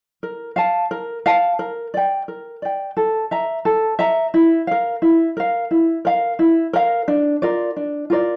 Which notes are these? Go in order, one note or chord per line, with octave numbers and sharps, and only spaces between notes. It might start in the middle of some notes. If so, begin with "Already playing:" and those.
A#4
F5 A5
A#4
F5 A5
A#4
D5 G5
A#4
D5 G5
A4
E5 A#5
A4
E5 A#5
E4
A#4 F5
E4
A#4 F5
E4
A#4 F5
E4
A#4 F5
D4
F4 A#4 D5
D4
F4 A#4 D5